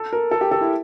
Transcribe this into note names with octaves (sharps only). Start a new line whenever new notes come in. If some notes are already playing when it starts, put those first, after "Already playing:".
Already playing: A4
A#4
A4
G4
A4
E4